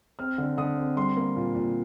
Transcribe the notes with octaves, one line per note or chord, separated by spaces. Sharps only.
C4 F6
D3
D3 D#6
C4
G3 C6
A#3
A#2
A#2